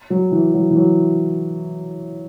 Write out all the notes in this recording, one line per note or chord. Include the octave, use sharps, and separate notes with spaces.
F#3
E3
F#3
E3
F#3